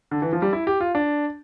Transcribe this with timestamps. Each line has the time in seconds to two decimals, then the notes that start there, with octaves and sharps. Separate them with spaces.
0.11 D3
0.22 E3
0.33 F3
0.42 G3
0.53 E4
0.67 G4
0.81 F4
0.95 D4